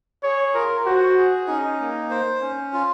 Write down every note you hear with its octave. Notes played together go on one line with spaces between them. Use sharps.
G#4 C#5
F4 A#4
F#4 C5
G#4
C#4 D#4
A#3
C5
C#4
F4